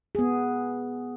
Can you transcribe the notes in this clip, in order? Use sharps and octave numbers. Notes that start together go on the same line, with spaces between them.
B3 G#4